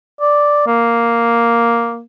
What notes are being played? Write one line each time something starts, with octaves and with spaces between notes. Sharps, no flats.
D5
A#3